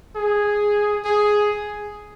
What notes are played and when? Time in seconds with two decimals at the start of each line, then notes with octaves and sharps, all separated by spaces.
0.16 G#4
1.04 G#4